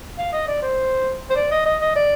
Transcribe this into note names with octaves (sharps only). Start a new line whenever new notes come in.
F5
D#5
D5
C5
C5
D5
D#5
D#5
D#5
D5